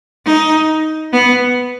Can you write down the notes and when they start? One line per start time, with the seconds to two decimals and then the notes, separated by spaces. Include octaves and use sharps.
0.26 D#4
1.13 B3